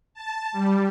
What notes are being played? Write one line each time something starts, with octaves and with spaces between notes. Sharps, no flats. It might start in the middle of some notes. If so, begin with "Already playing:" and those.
A5
G3